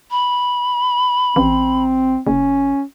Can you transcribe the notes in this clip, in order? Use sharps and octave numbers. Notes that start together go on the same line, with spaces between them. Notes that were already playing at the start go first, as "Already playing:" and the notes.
B5
A1 C4
F#1 C#4